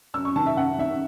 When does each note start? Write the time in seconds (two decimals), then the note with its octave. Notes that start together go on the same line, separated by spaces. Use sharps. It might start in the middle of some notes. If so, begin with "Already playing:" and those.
0.14 F#2 E6
0.25 C#6
0.36 D#3 A5
0.46 E5
0.57 F#2 F#5
0.79 D#3 E5